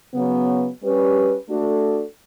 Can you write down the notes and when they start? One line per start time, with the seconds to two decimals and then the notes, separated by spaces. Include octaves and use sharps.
0.13 C#3 F#3 B3
0.81 G3 C#4 G4 B4
1.48 A3 D4 F#4 A4